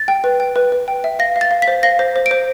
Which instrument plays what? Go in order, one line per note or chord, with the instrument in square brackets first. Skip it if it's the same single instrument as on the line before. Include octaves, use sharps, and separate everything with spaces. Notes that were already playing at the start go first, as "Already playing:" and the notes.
Already playing: [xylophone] A6
G5
B4
G5
B4
B4
G5
E5
F5 A#6
F5
A6
F5
B6
C5
F5 A#6
C5
C5
D7
C5